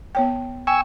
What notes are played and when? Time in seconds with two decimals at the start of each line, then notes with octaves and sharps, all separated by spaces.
0.15 B3 C#5 G5
0.67 G5 G#5 C#6 E6